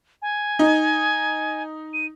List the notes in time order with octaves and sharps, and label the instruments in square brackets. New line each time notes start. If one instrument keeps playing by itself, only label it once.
[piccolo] G#5
[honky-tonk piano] D#4
[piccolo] D#7